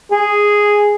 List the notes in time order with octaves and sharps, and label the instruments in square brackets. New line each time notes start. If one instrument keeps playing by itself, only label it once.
[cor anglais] G#4